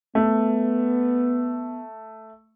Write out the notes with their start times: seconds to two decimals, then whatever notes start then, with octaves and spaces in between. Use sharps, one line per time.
0.15 A3 B3